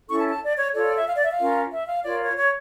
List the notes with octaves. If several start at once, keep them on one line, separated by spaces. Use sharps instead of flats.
C#4 E4 A4 C#6
A5
A5
D5
C#5
F4 A4 C#5 D5
D5
E5
F5
D5
E5
F5
C#4 F4 A#4
E5
F5
F4 A#4 C#5 D5
C#5
C#5